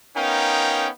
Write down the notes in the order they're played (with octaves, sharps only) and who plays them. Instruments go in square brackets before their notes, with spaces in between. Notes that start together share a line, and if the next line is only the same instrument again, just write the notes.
[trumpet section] B3 C#4 D#4 A#4 F5 G5